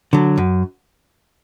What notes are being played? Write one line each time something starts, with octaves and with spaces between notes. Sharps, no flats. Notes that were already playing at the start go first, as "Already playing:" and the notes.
D3 F#3
F#2